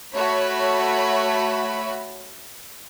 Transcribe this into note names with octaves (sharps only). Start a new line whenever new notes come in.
A3 F#4 C#5 B5